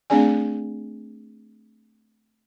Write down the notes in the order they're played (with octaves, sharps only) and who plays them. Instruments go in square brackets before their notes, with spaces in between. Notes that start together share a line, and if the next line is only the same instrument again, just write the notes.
[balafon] A3 C4 D4 G#4 D5 G#5